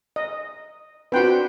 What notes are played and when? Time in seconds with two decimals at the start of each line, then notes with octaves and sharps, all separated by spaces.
0.16 D#5
1.12 C4 D4 F#4 B4 G5 C6